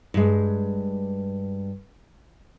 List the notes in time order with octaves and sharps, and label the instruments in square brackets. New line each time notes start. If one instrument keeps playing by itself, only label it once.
[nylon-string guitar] G2 G#3